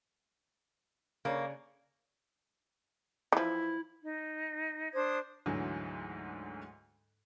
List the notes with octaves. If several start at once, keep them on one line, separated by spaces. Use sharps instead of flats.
C#3 A#3 D4 C#5
E3 F3 E4
D#4
D4 C5 D#6 G#6
D2 G#2 D3 E3 F#3